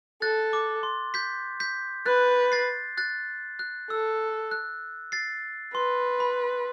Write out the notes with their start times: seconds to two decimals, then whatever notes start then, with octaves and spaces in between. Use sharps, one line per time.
0.22 A4 F#6 A6
0.53 D6
0.83 C6
1.14 G6 B6
1.60 G6 B6
2.06 B4 F#6 A6
2.52 A6 C7
2.98 F#6 A6
3.59 F#6
3.90 A4 E6
4.51 F#6
5.12 A6 C7
5.74 B4 C6
6.20 B5